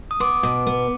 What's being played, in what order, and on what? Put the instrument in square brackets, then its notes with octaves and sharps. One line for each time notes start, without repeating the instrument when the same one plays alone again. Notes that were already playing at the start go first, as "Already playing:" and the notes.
[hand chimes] D#6
[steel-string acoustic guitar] B3 [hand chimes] C6 D6
[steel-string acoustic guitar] B2
B3